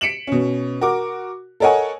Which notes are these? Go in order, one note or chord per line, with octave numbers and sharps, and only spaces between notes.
B6 C#7 D7 E7 F#7
B2 C#4
F#4 A#4 D6
A4 A#4 C#5 D#5 F#5 G#5